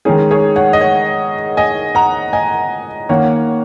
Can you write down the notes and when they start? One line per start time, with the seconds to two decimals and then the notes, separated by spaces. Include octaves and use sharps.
0.05 D#3 G#3 C#4 D#4 G#4
0.31 G#4 C#5
0.56 C#5 F#5
0.73 D#5
0.81 C#5 F#5
1.57 D#5 G#5
1.95 F#5 A#5
2.33 D#5 G#5
3.09 D#3 A#3 C#4 C#5 F#5